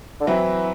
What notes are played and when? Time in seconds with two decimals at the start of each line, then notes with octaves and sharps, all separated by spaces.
0.21 D3
0.27 E3 F#3 C4 E4